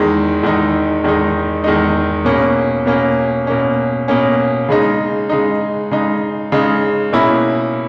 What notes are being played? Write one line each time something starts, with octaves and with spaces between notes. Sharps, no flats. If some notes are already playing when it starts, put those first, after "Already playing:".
Already playing: E2 D#3 G#3 D#4
E2 D#3 G#3 D#4
E2 D#3 G#3 D#4
E2 D#3 G#3 D#4
B2 A#3 C#4
B2 A#3 C#4
B2 A#3 C#4
B2 A#3 C#4
C#3 G#3 D#4
C#3 G#3 D#4
C#3 G#3 D#4
C#3 G#3 D#4
B2 A#3 C#4 E4